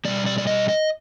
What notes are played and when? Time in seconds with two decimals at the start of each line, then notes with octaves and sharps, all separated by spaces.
0.05 B2 G3 D5
0.26 D5
0.38 D5
0.47 D#5
0.69 D#5